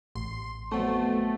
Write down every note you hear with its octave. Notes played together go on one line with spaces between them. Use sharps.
A1 C6
F2 B2 F#3 A3